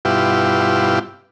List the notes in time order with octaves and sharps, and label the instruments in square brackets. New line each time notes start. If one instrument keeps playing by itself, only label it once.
[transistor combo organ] G2 B2 E4 F4 G4